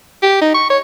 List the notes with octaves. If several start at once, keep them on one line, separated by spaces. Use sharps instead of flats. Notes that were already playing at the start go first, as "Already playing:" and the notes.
G4
D#4
C#6
C#5